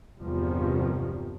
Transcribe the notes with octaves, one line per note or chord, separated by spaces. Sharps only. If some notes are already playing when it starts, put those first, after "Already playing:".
G1 E2 C3 D#3 F3 G3